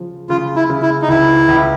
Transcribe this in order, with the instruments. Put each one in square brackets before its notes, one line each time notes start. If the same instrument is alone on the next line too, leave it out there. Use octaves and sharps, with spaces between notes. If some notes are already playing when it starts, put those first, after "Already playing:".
Already playing: [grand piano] C#3 F3
[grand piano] C#3 [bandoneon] F4
[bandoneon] E4
[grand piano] C#3
[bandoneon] E4
D#4
[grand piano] C#2 [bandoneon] E4
[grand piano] C#2